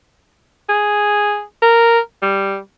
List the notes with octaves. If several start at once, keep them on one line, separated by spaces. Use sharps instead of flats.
G#4
A#4
G3